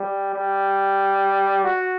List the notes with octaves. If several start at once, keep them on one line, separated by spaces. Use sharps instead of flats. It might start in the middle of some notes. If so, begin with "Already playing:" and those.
Already playing: G3
G3
F#4